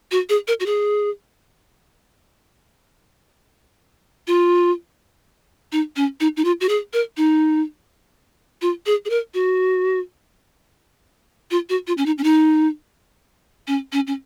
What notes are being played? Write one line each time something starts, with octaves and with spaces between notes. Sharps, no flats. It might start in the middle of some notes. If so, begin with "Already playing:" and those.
F#4
G#4
A#4
F#4
G#4
F4
D#4
C#4
D#4
D#4
F4
F#4
G#4
A#4
D#4
F4
G#4
G#4
A#4
F#4
F4
F#4
F4
C#4
D#4
C#4
D#4
C#4
C#4
C#4